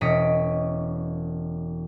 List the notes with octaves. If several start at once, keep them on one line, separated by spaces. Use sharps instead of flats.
E1 C#4 D#5 B6 C#7 D7